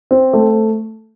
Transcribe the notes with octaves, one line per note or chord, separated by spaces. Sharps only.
C4
A3